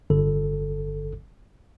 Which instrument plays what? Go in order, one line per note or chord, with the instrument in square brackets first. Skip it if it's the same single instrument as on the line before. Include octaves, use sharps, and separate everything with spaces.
[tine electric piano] G1 D3 A4